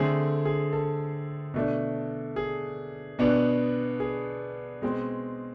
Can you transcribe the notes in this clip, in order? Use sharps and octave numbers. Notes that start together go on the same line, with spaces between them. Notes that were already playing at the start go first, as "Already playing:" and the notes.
Already playing: D3 A3 C4 G#4
G#4
A4
B2 A3 D4
G#4
B2 B3 D4
G#4
B2 G#3 C4